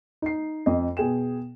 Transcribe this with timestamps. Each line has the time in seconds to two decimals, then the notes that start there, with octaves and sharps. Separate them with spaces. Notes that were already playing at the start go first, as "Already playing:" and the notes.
0.22 D#4 C7
0.66 F2 D#5
0.97 B2 G#4 G5 E7